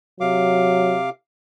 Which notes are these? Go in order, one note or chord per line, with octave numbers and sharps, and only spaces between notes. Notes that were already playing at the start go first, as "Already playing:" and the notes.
C3 F#3 F5 D6